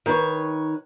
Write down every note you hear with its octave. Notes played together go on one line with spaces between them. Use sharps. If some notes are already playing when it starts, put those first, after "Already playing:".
D#3 B4 C#5